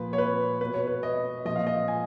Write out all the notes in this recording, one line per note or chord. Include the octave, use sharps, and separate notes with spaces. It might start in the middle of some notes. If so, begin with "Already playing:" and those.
Already playing: A#2 F3 B4
C#5
B4
B2 B4
C#5
B4
D#5
A#2 F3 D#5
F5
D#5
G#5